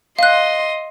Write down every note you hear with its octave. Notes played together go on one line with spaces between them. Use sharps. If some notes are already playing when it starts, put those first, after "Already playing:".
D#5 F5 C6 F#6